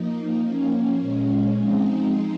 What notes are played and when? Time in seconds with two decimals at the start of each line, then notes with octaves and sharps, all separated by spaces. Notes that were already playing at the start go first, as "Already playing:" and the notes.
Already playing: F3 A#3 D#4
0.40 F3 A#3 C#4
0.99 A#2 G#3 C#4
1.57 F3 G#3 C4 D#4